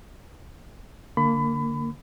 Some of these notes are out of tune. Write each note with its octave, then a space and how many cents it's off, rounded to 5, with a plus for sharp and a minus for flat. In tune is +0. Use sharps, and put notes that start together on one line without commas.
D3 +0 A#3 -20 B5 +25